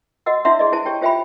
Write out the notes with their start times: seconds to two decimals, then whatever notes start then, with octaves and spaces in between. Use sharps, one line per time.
0.26 F#4 D#5 F#5 E6
0.45 D4 E4 C#5 E5 F#5 C6
0.59 G#4 D5 D#5
0.72 E4 C5 G#5 A5
0.85 G4 C#5 G5
1.01 F4 C5 E5 G5 G#5 B5